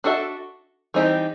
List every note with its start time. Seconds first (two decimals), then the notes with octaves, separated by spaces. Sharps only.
0.04 D4 F#4 A4 C5 E5
0.94 E3 G3 C4 D#4 G4